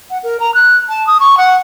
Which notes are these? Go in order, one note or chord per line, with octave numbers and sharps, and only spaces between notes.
F#5
A#4
A#5
F#6
A5
D#6
C#6
F#5